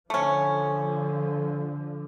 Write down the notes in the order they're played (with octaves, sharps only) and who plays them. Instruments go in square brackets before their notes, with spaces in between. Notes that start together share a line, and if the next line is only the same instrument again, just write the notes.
[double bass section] D3 F3 [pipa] A3 C#4